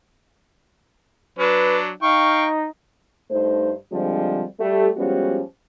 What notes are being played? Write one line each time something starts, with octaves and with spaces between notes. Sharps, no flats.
F#3 D4 B4
D#4 F5 G5 C#6
G2 A3 D#4 C5
D3 F3 G3 G#3 C4 D4
G3 A3 G4
F3 G3 G#3 B3 C#4 F#4